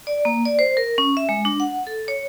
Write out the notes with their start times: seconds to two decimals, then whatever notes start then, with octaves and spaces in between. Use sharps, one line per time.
0.07 D5
0.25 A#3
0.45 D5
0.59 C5
0.77 A#4
0.98 C#4
1.17 E5
1.29 G#3
1.45 D4
1.60 F#5
1.87 A4
2.08 C#5